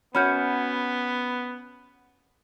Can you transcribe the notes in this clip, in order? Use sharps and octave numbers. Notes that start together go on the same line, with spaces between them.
B3 C#4 F#4 B5 F6 G6